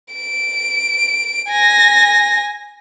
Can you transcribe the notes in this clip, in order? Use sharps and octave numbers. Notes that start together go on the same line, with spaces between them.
D7
G#5 A#6